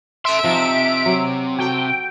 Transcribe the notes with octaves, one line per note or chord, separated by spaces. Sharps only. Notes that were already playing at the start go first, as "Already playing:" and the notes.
A4 E5 C6 D7
C3 F3 D#4
F#3 C5
F#4 G4 A4 G5